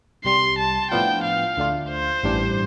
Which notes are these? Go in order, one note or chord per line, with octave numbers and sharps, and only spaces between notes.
C2 C3 G3 C6
A5
A2 F3 B3 D4 F4 G5
F5
D2 D3 A3 D4 F4
C5
A1 G2 E3 G3 D4